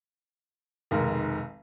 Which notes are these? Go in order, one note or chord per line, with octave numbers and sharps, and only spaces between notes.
F1 B1 D#3 G#3 A#4 A#5